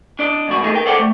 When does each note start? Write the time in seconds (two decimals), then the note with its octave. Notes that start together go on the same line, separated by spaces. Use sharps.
0.19 D4 D5 D#5
0.48 E2 G#2 B2 F#4
0.62 D#2 A3 D#4 G#4
0.74 A#4 G5
0.86 A4 C5 D5 F#5 G5
0.99 A3